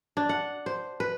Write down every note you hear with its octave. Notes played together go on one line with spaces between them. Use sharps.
D4
F#5
C5
B4